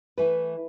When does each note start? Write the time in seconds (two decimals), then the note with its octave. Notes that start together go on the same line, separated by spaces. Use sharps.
0.18 E3 A3 B4